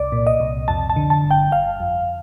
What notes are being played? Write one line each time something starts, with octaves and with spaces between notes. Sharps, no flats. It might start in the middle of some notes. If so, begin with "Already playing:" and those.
Already playing: C2 D5
A#2
D#5
C2
F2 A5
A5
D3
A5
G1
G5
G1 F5
F2